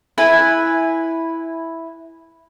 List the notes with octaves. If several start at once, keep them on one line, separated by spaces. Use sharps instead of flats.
E4 B4 G#5